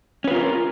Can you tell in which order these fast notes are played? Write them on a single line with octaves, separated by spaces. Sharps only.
C#4 B4 F4 A#4